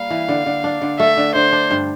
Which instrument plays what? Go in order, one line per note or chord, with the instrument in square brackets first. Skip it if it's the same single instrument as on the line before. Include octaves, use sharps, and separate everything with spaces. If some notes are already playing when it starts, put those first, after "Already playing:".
Already playing: [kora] G3 A#3 [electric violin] F5
[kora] E3
D3
D3
D4
D3
[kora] A3 [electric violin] E5
[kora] D3
[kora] D3 [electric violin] C5
[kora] D4
G2